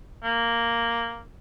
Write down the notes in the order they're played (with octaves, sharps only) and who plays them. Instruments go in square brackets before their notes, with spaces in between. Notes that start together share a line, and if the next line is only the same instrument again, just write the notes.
[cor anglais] A#3